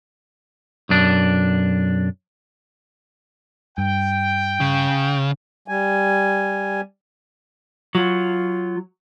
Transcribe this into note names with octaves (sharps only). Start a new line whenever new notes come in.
B1 F#2 D4
G2 G5
C#3
G3 G#5
F#3 F4